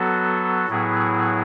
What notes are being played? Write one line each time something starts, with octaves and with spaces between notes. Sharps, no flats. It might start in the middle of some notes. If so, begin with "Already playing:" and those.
Already playing: F#3 B3 F#4 A4
A2 F#3 B3 E4 G#4